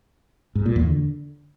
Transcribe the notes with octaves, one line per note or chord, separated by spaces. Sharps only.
G#2
A#2
E2
D3